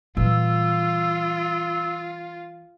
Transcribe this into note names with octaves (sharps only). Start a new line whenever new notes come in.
A#2 E3 G3 F4 E6